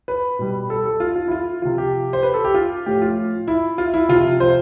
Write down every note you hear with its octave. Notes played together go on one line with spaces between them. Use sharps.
B4
B2 G3
A4
A4
F4
F4
E4
F4
C3 F3 F4
G4
C5
B4
A4
G4
F4
A2 F3 G4
F4
E4
F4
E4
C3 F3 F4
C5